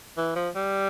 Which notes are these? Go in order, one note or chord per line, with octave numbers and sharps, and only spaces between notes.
E3
F3
G3